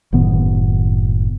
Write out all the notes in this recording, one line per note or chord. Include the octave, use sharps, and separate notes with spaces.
F#1 A2 D#3 B3